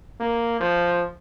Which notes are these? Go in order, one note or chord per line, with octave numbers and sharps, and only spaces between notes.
A#3
F3